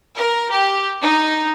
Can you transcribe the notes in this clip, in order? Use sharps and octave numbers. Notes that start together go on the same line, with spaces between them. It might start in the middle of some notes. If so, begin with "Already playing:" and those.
A#4
G4
D#4